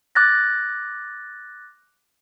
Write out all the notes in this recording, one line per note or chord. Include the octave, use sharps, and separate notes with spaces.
D6 F#6 A6 A#6